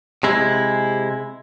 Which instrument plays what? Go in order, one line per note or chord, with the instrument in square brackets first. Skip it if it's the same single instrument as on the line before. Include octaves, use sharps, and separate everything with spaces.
[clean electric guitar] C3 G#3 E4